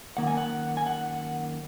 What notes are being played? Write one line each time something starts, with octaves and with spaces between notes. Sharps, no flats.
F#2 D#3 A#3 F#5
G#5
F#5
G#5
F#5